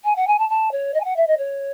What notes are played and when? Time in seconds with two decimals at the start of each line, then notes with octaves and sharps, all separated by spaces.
0.04 G#5
0.16 F#5
0.27 G#5
0.39 A5
0.49 A5
0.72 C#5
0.94 D#5
1.00 G#5
1.04 F#5
1.16 E5
1.27 D#5
1.38 C#5